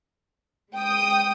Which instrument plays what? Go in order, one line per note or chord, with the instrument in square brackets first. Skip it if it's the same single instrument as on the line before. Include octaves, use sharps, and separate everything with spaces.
[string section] G#3 G5 D#6